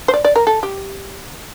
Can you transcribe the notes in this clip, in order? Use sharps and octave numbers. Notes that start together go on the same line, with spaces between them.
C5
D5
D5
A#4
A4
G4